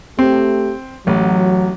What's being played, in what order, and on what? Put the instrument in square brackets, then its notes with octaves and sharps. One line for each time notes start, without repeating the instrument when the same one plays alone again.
[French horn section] A3 G4 [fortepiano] C4
[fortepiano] A1 [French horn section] F#3